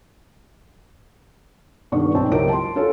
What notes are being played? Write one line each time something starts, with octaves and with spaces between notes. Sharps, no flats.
D#1 G2 D#3 B3 D5 C#6
B1 C4 A5
C#2 F#3 E4 G4 A#4 D7
A5 C6
C#4 F4 F#4 A4